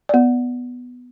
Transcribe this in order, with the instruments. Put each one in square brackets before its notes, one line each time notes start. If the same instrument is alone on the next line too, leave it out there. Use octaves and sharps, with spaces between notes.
[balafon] B3 D5